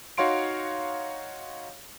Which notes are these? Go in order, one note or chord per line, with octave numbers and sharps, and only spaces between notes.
D#4 F#4 C#5 F5 C6 D7